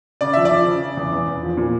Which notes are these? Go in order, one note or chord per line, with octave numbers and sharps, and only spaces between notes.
C#3 D5
F3 E5
D5
F3
C#3
C#3
E2
E2
E2
F3
A#2